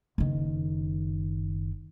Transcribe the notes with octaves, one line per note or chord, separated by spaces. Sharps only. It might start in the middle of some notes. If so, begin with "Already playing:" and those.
F#1 D#3